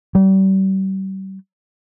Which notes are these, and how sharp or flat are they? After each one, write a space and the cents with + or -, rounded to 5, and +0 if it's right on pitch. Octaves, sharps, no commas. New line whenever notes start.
G3 -35